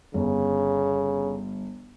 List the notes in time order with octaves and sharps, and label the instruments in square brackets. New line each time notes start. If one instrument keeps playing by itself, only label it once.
[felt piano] G1 [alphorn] C#3